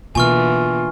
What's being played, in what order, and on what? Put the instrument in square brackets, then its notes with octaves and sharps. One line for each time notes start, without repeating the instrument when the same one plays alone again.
[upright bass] B2 [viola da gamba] D3 E3 A#3 [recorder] F4 [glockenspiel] G#5 C#6 F6